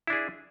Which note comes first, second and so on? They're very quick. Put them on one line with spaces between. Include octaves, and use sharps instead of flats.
E4 D4 G#4